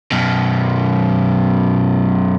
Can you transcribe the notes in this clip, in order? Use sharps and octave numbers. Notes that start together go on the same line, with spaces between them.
F#2 B2